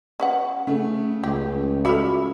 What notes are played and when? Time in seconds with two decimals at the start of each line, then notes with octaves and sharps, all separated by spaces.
0.20 C#4 B4 F#5
0.67 C#3 A3
1.24 C#2 G4
1.85 C#3 F#4 A4 E5 B5